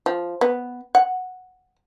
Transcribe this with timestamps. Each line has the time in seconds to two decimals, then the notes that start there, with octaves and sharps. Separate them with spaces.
0.06 F3
0.41 B3
0.95 F#5